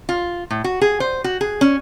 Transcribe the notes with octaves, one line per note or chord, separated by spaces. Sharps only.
F4
A2
F#4
G#4
C5
F#4
G#4
C#4